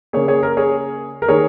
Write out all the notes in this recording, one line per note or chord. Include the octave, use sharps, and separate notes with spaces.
C#3 A#3 G#4 C#5
G#4 C#5
A#4
G#4 C#5
A#4
D#3 A#3 G#4 C#5